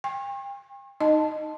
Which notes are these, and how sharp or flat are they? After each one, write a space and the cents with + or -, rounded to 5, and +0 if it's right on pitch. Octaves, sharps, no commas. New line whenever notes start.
G5 +35 C#6 -40
D#4 +0 D#5 -10 A5 +0